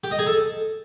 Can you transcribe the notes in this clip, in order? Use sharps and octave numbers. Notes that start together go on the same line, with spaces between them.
G4
D#5
G#4
A4